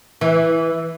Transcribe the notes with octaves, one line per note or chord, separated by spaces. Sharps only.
E3